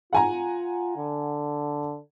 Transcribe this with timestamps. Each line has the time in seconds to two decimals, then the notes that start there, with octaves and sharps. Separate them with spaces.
0.13 F4 F#5 G#5 A#5
0.97 D3